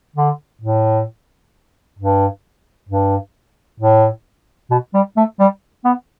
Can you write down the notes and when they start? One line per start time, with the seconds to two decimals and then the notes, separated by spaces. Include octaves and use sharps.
0.16 D3
0.62 A2
1.99 G2
2.89 G2
3.80 A2
4.71 B2
4.94 G3
5.17 A3
5.40 G3
5.85 B3